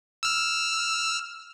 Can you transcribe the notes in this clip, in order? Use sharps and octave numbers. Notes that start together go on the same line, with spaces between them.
E6 F6